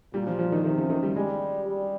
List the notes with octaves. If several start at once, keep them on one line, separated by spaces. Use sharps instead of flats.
A#2 G3
F3
F3
D#3
C3 D#3
C#3
D#3
G3
G3 G#3
G3